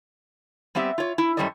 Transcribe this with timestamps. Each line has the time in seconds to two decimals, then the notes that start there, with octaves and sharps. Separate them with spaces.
0.75 G3 B3 C4 G4 E5
0.98 F4 C#5
1.18 E4
1.37 F#2 C#3 G3 A4 C#5 D#5